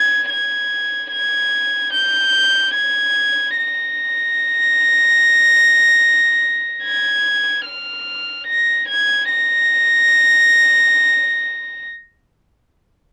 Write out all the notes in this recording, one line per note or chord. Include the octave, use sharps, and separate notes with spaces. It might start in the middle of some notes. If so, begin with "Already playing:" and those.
Already playing: G#6
G#6
G#6
G6
G#6
A#6
G#6
F6
A#6
G#6
A#6